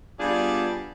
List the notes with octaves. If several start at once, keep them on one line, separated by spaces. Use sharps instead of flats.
G3 B3 D4 F4 G#4